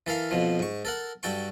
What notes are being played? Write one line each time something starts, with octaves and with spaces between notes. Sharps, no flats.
E3 A4 A#4 F5
F2 B2 F3
G#2 C#6
A4 A#4 F#5
G2 F#4 A4 G5 C#6